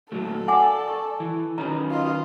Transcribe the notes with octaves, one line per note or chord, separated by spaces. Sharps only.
A#2 F#3 A3 A4
D5 F#5 G#5 D6
C#6
E3
D#3 C#4 F#4 B4 A#5
F4 D#5